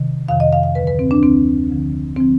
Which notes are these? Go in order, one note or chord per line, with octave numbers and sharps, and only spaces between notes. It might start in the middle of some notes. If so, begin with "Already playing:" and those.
Already playing: C3 D#3
F2 C3 D#3 F5
D#5
F5
F5
D2 D3 F3 B4
B4
C4
D4
D2 D3 F3 C4
D2 D3 F3
D3 F3 C4